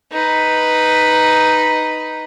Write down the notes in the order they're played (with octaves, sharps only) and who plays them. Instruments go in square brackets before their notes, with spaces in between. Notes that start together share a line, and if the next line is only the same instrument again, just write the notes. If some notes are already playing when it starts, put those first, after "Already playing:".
[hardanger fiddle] D#4 B4